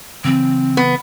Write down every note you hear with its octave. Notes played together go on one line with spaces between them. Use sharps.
C#3 E3 F#3 C4
B3